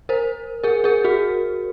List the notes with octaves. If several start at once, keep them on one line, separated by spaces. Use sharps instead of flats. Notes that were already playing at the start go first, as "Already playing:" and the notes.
A#4 C5
G#4 A#4
G#4 A#4
F#4 G#4